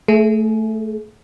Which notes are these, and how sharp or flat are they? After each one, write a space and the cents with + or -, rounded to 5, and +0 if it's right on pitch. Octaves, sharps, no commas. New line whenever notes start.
A3 +0 G#4 +35